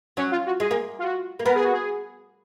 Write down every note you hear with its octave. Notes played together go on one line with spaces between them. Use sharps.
F#3 C#4
F4
F#4
G#3 G#4
A#3
F4
F#4
A#3
B3 A#4
G#4
F#4
G#4